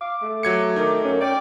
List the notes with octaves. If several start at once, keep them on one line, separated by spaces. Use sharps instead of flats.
F5 D6
A3
F#3 G#6 C#7
D#3 D#4
F#2 A#3 C#4
C#4 D5 G5